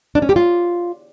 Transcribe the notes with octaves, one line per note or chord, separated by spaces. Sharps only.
D4
C#4
G4
F4